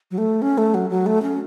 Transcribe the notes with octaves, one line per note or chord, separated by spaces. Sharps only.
F#3
A3
C#4
A3
F#3
F#3
A3
C#4